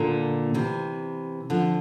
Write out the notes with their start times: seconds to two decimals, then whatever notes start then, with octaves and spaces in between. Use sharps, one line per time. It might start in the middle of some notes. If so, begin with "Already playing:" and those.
Already playing: A#2 D3
0.54 C3 E3
1.50 D3 F3